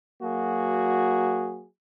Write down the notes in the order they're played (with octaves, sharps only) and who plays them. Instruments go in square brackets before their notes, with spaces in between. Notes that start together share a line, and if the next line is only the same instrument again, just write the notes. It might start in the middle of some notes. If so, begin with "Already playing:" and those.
[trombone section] F#3 A#3 F#4 G#4